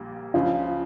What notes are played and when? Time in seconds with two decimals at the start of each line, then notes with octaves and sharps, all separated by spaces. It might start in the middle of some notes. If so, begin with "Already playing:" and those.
Already playing: A#1 A#2 G3 A#3
0.34 C#2 C#3 F3 F4